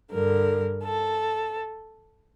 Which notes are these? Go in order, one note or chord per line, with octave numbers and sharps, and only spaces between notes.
G2 D3 A#4
A4